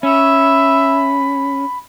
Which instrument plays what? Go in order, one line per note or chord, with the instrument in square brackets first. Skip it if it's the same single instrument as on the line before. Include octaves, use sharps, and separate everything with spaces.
[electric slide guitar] C#4 [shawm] E5 [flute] B5